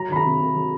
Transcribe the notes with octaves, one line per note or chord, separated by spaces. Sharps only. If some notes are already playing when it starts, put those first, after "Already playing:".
Already playing: F#3 A#5
D#3 B5
A#5
C3
C3
F#3